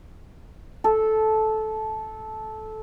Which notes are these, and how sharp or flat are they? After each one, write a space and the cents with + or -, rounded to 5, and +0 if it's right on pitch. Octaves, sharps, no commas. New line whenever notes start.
A4 -15